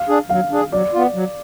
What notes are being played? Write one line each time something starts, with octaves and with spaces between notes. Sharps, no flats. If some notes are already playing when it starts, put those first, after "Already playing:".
Already playing: F5
D4 G#4
F#3 F5
D4 G#4
F#3 D5
B3 F4
F#3